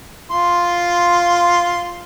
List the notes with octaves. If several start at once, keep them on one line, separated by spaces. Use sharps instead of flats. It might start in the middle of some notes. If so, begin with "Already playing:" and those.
F4 C6